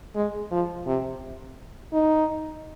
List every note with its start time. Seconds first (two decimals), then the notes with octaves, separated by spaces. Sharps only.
0.15 G#3
0.51 F3
0.87 C3
1.93 D#4